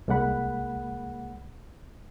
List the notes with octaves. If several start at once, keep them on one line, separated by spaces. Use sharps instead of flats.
C2 G#3 A#3 F#5 B5